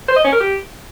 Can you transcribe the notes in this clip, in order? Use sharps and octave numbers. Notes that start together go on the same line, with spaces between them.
C5
D#5
C#4
A#4
G4